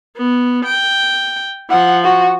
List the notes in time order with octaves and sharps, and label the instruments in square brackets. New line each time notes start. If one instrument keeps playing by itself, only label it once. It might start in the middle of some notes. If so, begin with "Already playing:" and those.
[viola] B3
G5
[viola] F3 [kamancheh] F#5
[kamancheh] F#4